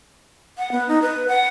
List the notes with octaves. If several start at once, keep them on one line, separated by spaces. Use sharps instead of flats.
F#5
B3
D#4
B4
F#5